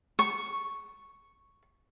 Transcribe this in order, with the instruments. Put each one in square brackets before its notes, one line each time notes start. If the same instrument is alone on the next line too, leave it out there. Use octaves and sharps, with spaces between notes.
[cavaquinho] C#6